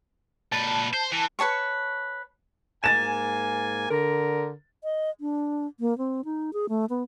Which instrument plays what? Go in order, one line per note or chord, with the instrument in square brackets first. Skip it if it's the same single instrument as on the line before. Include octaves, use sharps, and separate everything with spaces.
[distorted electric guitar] A#2 B4 [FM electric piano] A5
[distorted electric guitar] C5
E3
[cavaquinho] B4 C#5 A5 C#6
[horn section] G#2 A#3 G#5 [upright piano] A6 E7
[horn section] D3 A#4
[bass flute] D#5
D4
A#3
C4
D#4
G#4
A3
B3